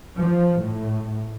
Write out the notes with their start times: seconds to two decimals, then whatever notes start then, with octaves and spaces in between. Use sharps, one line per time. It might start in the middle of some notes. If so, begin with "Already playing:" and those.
0.18 F3
0.61 A2